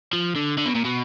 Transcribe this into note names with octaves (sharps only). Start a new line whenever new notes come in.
F3
D3
D3
B2
A#2
B2